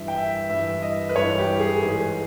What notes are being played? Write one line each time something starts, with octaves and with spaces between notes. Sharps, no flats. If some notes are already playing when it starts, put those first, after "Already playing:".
Already playing: G2 E3 E5
G5
E5
G2 E3 E5
D#5
B4
G2 E3 C#5
G4
G#4
G#2 E3 G#4